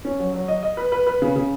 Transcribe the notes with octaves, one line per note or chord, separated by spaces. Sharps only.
C#4
F#3
F#3
D#5
D#5
B4
B4
B4
C#3
C#3